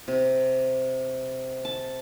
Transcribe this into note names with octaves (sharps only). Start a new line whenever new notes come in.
C3
A5